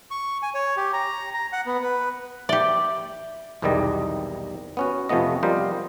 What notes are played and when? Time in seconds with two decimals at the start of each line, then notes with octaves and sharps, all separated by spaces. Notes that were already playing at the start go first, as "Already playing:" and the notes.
0.11 C#6
0.42 G#5
0.54 C#5
0.77 G4
0.93 A#5
1.34 A#5
1.53 F#5
1.66 B3
1.82 B4
2.49 G4 D5 E5
3.62 B1 E2 C3 D#3 G3 D#5
4.77 B3 C#4 F#4
5.09 F2 C3 F3 A3 B3 D#5
5.43 F3 G3 A#4 C5 D#5